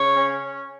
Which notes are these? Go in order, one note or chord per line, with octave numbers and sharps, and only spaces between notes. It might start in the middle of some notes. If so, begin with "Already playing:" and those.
Already playing: C#3 C#5
C#4